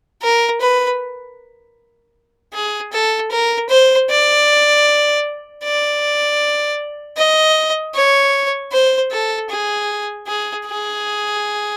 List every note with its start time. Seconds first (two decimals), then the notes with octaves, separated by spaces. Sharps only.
0.22 A#4
0.61 B4
2.54 G#4
2.92 A4
3.31 A#4
3.69 C5
4.09 D5
5.64 D5
7.17 D#5
7.94 C#5
8.72 C5
9.11 A4
9.50 G#4
10.27 G#4
10.66 G#4